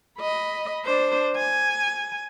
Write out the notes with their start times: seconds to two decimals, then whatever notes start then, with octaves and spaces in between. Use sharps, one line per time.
0.19 D#5 B5
0.85 D4 C5
1.36 G#5